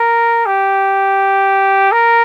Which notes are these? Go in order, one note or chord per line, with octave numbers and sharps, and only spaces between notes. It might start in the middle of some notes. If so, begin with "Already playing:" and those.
Already playing: A#4
G4
A#4